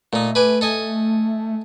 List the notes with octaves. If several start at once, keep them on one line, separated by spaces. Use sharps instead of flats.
A#2 A3 D#4
B4 G#5 D6
A4 D#5 G#5